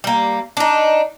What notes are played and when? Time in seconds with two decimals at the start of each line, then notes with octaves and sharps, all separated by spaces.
0.04 G3 A#3
0.57 D4 D#4